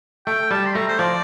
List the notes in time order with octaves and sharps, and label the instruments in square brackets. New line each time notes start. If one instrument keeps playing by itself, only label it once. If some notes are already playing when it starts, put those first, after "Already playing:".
[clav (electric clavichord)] A3 [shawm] G5
[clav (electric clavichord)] G3 [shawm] A5
[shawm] C6
[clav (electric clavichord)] A3 [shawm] A#5
[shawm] C5
[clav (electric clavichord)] F3 [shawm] D5